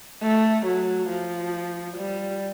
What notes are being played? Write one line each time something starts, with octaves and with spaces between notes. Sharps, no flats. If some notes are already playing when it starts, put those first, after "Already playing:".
A3
F#3
F3
G3